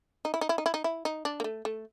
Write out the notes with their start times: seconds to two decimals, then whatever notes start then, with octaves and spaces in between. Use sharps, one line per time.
0.25 D#4
0.34 E4
0.41 D#4
0.49 E4
0.58 D#4
0.66 E4
0.74 D#4
0.84 E4
1.05 D#4
1.25 D4
1.40 A#3
1.44 A3
1.65 A3